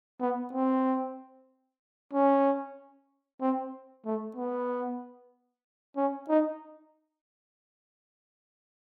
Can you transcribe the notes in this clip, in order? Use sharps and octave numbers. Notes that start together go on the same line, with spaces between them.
B3
C4
C#4
C4
A3
B3
C#4
D#4